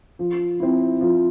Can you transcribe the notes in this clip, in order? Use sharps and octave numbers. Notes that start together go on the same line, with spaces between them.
F3
C4 E4
F3